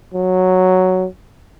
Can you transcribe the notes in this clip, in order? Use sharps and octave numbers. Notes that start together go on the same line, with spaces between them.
F#3